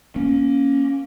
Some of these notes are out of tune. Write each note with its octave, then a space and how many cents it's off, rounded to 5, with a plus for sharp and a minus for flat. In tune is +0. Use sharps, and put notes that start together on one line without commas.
A#3 +15 C#4 +0